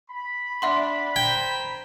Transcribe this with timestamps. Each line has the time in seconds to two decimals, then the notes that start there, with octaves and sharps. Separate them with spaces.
0.11 B5
0.62 D4 E5 F#5 C6
1.16 C5 G5 A#5 G#6